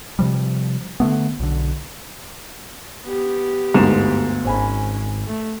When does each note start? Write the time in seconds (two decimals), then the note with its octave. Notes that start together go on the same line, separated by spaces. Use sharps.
0.19 C3 F3 G3
1.00 D3 D#3 A3 B3
1.40 B1 D3
3.03 B3 G4
3.74 G1 D2 G#2 E7
4.45 G#1 C#4 C5 G#5 B5
5.27 A3